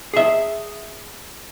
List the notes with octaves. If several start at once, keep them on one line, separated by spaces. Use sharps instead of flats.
G#4 E5